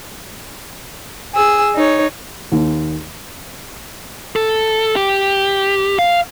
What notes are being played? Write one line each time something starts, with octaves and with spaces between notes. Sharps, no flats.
G#4 E6
D#4 C#5
D#2
A4
G4
F5